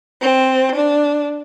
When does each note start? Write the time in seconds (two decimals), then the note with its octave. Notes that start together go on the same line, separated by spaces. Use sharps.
0.22 C4
0.75 D4